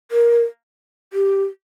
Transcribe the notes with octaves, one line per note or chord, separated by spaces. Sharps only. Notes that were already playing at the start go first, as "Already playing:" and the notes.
A#4
G4